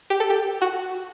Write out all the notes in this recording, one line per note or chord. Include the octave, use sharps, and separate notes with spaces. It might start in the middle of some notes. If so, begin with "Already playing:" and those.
G4
A4
G4
F#4